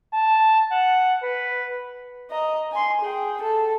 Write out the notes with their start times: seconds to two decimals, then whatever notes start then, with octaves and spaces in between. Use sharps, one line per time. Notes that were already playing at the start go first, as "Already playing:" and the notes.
0.13 A5
0.72 F#5
1.23 B4
2.31 D#5 A#5
2.72 G#5 C6
3.01 G#4 G5
3.41 A4 A5